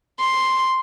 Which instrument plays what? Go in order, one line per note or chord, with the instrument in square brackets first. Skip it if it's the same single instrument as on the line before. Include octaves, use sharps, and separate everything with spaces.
[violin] C6